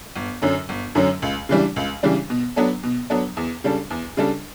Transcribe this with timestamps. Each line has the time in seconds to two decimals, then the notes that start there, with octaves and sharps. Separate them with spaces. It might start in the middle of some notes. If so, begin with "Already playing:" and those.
0.16 G1
0.42 F#2 D3 F#3 C#4
0.69 G1
0.95 F#2 D3 F#3 C#4
1.22 C#2
1.49 C#3 E3 G3 D4
1.76 C#2
2.03 C#3 E3 G3 D4
2.30 B2
2.56 F#3 B3 D4 A4
2.83 B2
3.10 F#3 B3 D4 A4
3.37 E2
3.64 C#3 G3 D4 A4
3.90 E2
4.17 C#3 G3 D4 A4